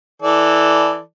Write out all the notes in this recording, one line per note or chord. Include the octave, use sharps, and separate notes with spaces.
E3 A4 D5